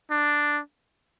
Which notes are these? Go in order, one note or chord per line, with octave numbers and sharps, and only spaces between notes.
D4